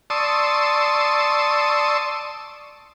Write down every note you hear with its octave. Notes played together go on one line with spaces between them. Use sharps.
D5 A5 C6 C#6 D#6 E6